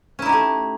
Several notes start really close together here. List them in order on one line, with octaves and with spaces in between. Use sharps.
C#4 E4 D#4 G4 A3